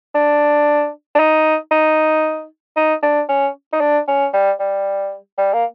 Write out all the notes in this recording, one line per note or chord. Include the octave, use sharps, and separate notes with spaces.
D4
D4
D#4
D#4
D#4
D4
C#4
D#4
D4
C#4
G3
G3
G3
A#3